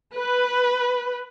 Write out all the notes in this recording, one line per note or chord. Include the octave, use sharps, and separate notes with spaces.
B4